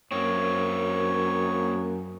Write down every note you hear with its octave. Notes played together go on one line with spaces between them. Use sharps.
F#2 A#3 C4 C#5